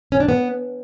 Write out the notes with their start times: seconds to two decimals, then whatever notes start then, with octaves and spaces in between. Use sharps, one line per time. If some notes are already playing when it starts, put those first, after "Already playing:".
0.12 C#4
0.20 D4
0.29 B3